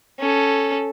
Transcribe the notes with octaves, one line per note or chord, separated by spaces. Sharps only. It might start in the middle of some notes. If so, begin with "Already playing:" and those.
C#4 A4